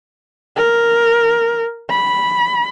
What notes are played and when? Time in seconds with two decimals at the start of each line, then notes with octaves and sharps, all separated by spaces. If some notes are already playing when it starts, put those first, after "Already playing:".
0.57 A#4
1.90 B5